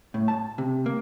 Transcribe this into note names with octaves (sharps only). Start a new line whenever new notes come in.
A2
A5
C3
A#3